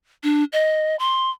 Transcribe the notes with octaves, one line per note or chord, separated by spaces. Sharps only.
D4
D#5
C6